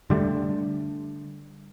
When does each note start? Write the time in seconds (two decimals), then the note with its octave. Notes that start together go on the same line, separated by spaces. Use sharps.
0.10 D3 G3 A3